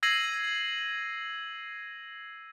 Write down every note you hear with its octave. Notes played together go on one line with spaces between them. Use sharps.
E6 G#6 A#6 C7 D#7 F#7